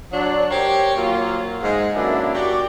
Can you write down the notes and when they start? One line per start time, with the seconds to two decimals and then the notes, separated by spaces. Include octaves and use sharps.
0.12 F#3 D4
0.50 G4 A#4 C5 C#5
0.96 F#3 A#3 F4
1.62 G#2 G#3
1.95 F#2 F#3 A3 A#3 D4 E4
2.35 F#4 G4 D5